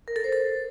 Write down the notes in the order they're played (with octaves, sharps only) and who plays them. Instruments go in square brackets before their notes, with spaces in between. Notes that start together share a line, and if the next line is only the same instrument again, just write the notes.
[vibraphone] A#4
A4
C5
A4